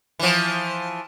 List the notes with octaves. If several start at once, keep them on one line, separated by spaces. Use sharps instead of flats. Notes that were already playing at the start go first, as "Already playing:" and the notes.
E3 F3